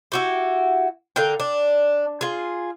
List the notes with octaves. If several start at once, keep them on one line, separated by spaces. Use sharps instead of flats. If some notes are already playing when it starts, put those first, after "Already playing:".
E4 F#4 G4
D3 A#4 F5 G5
D4
F4 G#4